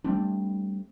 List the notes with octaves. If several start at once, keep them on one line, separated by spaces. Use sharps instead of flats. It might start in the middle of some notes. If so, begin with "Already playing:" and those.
G3 A3 C4 D4